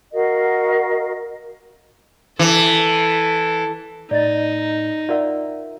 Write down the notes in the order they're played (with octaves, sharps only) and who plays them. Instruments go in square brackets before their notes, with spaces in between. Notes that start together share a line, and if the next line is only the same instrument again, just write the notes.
[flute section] F#4 A#4 D#5 F5
[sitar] E3 [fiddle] A4
[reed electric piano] A2 [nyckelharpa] D#4 [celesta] D5 D#5 A6
[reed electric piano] F4 A#4 E5 [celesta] D5 F#5